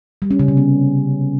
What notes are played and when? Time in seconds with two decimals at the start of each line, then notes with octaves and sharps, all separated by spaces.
0.22 G3
0.31 C#4
0.39 C#3
0.48 C3
0.57 B3